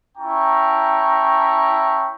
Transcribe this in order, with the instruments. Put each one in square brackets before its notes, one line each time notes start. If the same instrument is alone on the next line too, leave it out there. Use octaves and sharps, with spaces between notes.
[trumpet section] C#4 E4 G5 A5 A#5 C#6